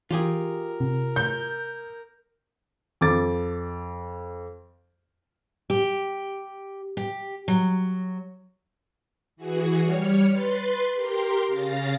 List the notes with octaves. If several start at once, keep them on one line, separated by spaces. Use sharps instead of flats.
E3 F4 G4 G#4 A#4
C3
G6
F2 D6 A6
G4
G4
F#3
E3 F#4 G#4
G3 C#5 C#6 F6
B4 C6 A6
G4 A#4 C6
C#3 F5 A6 A#6